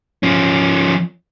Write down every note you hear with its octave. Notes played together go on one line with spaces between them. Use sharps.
F3 C#4